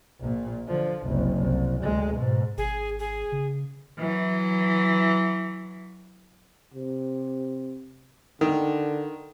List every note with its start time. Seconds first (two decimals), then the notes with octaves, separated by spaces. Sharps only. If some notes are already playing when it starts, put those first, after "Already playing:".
0.20 A#1 A#2
0.68 D3 F3
1.05 F#1 C2
1.37 C2
1.82 D2 G#3
2.16 G#2 B2
2.57 G#1 G#4
2.99 G#4
3.32 C#3
3.99 E3 F#3
6.74 C3
8.41 D3 D#3